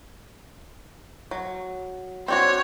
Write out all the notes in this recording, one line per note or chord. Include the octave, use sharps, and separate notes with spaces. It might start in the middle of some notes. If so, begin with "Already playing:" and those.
F#3
C4 D4 F#4 C#5